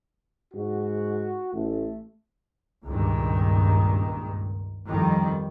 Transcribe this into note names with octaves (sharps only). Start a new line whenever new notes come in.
G#2 F#4
A1 A3
C#2 G2 A#2 D#3
F2 D#3 G3